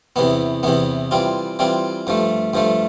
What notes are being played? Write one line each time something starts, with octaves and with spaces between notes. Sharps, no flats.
E2 C3 E3 B3
E2 C3 E3 B3
E3 G3 C4 F4
E3 G3 C4 F4
G2 F3 A3
G2 F3 A3